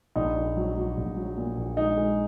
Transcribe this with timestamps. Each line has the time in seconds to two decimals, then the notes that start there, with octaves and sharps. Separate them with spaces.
0.16 A#1 D#4
0.36 A#1
0.57 F#3
0.76 F#3
0.97 A#1
1.17 F#3
1.37 A#2
1.57 A#1
1.77 G#3 D#4
1.98 G#3